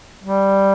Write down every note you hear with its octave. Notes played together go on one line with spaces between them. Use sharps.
G3